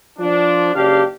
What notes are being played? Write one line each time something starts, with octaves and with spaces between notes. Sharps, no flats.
F3 D4
F#1 C#3 D4 G4 D5 F5